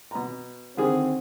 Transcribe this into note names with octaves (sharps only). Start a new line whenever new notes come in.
B2 A#5
D3 D#3 C4 G#4